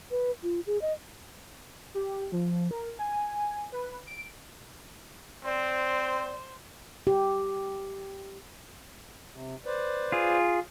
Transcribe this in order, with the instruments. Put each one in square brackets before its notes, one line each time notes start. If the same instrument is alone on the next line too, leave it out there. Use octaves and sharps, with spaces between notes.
[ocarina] B4
F4
G#4
D#5
[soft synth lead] G4
F3
A#4
G#5
B4
D7
[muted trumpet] C4 [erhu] C5 [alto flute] D5
[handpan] G4
[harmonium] C3
B4 C5 D5
[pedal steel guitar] F4 G#4